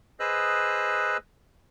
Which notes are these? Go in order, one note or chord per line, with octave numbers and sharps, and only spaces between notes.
G#4 B4 C5 D#5 E6 F#6